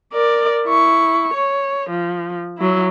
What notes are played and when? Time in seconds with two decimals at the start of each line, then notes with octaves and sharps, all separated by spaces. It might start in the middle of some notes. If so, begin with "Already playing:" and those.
0.14 A#4 D5
0.66 E4 C#6
1.34 C#5
1.90 F3
2.58 F#3 E4